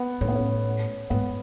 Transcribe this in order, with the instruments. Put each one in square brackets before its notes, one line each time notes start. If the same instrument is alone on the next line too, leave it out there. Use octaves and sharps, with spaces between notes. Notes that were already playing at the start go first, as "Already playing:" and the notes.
Already playing: [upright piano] B3
[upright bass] A2 [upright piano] C#4
[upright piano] B3
C#4
[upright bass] G#2 [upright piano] B3